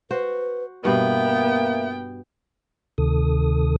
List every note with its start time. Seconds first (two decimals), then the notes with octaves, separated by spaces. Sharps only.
0.11 F#4 B4 C5
0.85 G2 B2 A#3 B3 E5 G5
2.98 D2 C3 D#3 A4 D#6